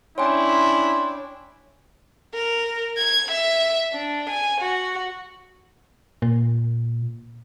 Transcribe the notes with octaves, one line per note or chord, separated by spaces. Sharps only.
C#4 D4 E4 C#5 G5 G#5 C6
A#4
G#6
E5
D4
G#5
F#4
A#2